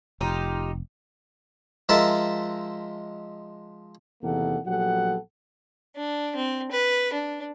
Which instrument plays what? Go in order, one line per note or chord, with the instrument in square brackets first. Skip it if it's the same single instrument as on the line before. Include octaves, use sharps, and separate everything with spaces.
[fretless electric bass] F1 [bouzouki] D#4 F4 G4
[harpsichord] F3 G#3 A#4 E5 A5
[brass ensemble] E2 C3 D#3 A#3 A4 F#5
A#1 F#3 B3 G4 A4 F#5
[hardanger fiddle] D4
C4
B4
D4